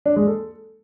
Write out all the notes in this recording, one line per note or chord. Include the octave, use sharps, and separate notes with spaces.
D4
G#3
A4